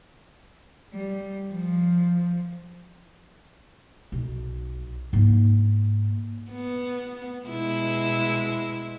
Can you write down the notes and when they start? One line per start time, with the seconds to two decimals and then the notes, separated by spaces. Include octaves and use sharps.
0.94 G3
1.52 F3
4.12 B1
5.13 G#2 A#3
6.52 B3
7.47 B2 G#3 E4